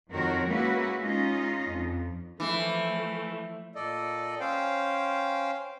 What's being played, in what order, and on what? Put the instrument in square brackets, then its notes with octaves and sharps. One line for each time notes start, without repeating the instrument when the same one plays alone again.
[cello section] F2 D#3 F#4 A#4 C5 C#5
G#3 A#3 C#4 E4 F#4 B4
G#3 C#4 D#4 F4 D#5
F2
[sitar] E3 [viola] F3 A3
[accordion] A#2 A4 D5 D#5
C#4 C5 F5 G5